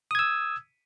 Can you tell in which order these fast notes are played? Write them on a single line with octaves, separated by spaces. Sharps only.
D#6 G#6 E6